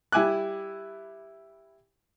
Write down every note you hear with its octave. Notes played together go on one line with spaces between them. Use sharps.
G3 E4 G#5 D6 F#6